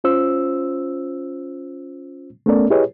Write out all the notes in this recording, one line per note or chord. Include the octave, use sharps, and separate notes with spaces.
C#4 F4 C5 E6
A3 B3 C#4 A4 A#4 D5
E4 G4 G#4 B4 C#5 D#5